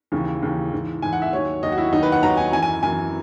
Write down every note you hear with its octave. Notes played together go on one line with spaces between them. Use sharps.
D#2 C#3 E3
D#2 C#3 E3
G#2 E3
G#2 E3 G#5
F#5
E5
D#2 D#3 F#3 C#5
D#2 D#3 F#3 D#5
F#4
E4
D#2 D#3 F#3 D#4
B4
F#5
D#2 D#3 F#3 A#5
G#5
F#2 E3 G#5
G#5
F#2 E3 G#5